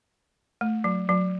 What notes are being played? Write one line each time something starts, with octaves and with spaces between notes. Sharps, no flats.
A3
F#3
F#3